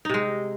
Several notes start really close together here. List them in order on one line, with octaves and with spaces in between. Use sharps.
D#4 C3 G#3